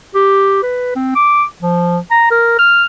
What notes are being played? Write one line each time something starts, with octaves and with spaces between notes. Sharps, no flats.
G4
B4
C4
D6
F3
A#5
A#4
F6